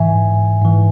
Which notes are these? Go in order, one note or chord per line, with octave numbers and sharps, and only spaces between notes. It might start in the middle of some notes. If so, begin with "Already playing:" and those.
Already playing: G#2 E3 E5 G#5
G#2 E3